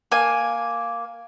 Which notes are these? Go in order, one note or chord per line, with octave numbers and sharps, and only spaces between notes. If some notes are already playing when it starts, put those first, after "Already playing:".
A#3 G#5